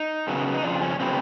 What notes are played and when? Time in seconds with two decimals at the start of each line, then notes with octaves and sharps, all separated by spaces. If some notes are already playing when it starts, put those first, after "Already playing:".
Already playing: D#4
0.27 F#2 C#3 F#3 B3
0.54 D#4
0.63 F2 C#3 F3 D4
0.82 C#4
1.00 C#3 F#3 B3 C4